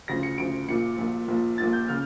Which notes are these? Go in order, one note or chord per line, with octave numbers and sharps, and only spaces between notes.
D2 C#3 F3 A#6
C#7
D2 C#3 F3 D7
A#1 A#2 F3 C#7
A#1 A#2 F3
A#1 A#2 F3
A#1 A#2 F3 A6
G6
C#3 F6